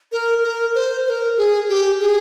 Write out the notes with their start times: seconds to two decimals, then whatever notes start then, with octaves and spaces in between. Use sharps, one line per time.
0.12 A#4
0.43 A#4
0.75 C5
1.06 C5
1.10 A#4
1.37 G#4
1.69 G4
2.01 G#4